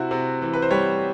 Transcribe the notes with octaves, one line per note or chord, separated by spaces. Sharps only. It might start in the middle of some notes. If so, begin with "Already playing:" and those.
Already playing: C3 E4 F#4
C3
E3
B4
C5
G3 B4 C#5